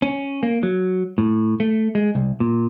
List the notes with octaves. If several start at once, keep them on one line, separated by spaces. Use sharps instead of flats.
C#4
A#3
F#3
A2
A3
G#3
C2
A#2